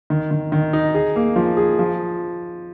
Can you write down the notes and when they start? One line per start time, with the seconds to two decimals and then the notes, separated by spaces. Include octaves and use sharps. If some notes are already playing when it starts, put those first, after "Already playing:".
0.10 D#3
0.31 D#3
0.52 D#3
0.73 D#4
0.95 G#4
1.16 A#3
1.36 F3
1.57 G#4
1.79 F3